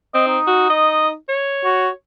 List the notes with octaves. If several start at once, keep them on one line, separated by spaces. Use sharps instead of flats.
C4 D#5
D#4
F#4
D#5
C#5
F#4